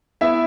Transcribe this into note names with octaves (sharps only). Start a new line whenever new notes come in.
B3 E4 E5